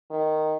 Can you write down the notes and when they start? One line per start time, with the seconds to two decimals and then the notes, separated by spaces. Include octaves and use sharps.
0.11 D#3